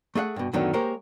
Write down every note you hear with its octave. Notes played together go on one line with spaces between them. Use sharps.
A3 G#4 E5 F#5
G2 B2
F#2 A2 D3 D#3 B3 C#4
G#3 A#3 G4 A#4 C5 C#5